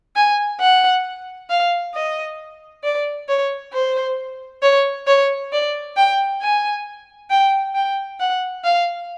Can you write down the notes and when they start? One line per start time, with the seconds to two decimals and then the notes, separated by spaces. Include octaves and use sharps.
0.16 G#5
0.61 F#5
1.50 F5
1.94 D#5
2.84 D5
3.28 C#5
3.73 C5
4.62 C#5
5.07 C#5
5.52 D5
5.96 G5
6.41 G#5
7.30 G5
7.75 G5
8.20 F#5
8.64 F5